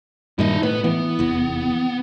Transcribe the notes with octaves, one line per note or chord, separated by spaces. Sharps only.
G2 A#2 D#3 E4 D#5
A2 B3 B4
E3 B3
F1 E2